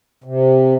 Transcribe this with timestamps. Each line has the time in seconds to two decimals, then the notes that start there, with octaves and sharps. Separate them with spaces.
0.24 C3